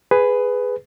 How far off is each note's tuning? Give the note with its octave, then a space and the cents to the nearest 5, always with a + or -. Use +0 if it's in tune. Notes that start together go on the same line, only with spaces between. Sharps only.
G#4 +0 B4 +10